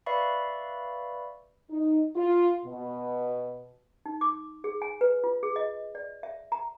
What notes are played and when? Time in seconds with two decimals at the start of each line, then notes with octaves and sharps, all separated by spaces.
0.06 B4 D5 E5 F5 B5 C#6
1.70 D#4
2.16 F4
2.65 B2
4.06 D#4
4.21 D6
4.64 G#4
4.82 G#5
5.01 B4
5.24 F4
5.43 G#4
5.56 D#5
5.95 D5
6.23 E5
6.52 A#5